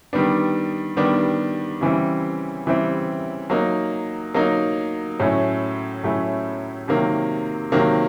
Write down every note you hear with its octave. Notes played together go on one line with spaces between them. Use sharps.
D#3 G3 B3 D4
D#3 G3 B3 D4
C#3 E3 G3 C4 E4
C#3 E3 G3 C4 E4
F#3 A#3 D#4
F#3 A#3 D#4
A2 F#3 A3 C#4 E4
A2 F#3 A3 C#4 E4
C3 D#3 F#3 A#3
C3 D#3 F#3 A#3